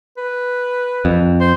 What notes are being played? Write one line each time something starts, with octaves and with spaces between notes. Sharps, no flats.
B4
F2
C5